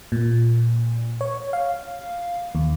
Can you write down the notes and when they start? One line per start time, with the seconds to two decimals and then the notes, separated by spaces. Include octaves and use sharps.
0.12 A#2
1.21 C#5
1.53 F5
2.55 D#2